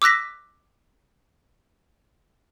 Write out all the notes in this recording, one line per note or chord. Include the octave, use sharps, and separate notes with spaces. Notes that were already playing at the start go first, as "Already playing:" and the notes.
D6 E6 F#6 A#6 B6